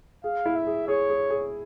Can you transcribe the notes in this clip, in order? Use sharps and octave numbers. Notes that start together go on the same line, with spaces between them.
G#4 F5
E4
E5
G#4
G#4 C#5
G#4
G#4